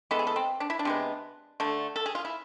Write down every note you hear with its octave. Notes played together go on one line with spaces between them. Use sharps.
E3 G#3 B3 A4
G#4
A4
C4
D4
E4
D4
C3 G#3 B3
D3 A3
A4
G#4
F4
E4